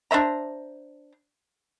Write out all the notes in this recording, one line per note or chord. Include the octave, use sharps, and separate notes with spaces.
D4 C5 E5 A#5